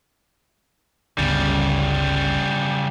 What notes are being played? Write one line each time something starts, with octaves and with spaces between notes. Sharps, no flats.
G1 C#2 C#3 G3